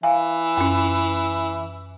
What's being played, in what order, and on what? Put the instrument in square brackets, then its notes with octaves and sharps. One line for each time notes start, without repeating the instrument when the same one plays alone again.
[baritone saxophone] E3 [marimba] F5 G#5
[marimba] F#2 C#4